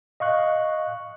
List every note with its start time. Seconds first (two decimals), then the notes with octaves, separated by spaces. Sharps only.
0.20 D#5 F5 C#6 F#6